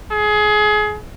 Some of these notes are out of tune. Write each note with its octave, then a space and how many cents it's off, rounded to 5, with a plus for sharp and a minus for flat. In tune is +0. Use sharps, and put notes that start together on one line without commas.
G#4 +25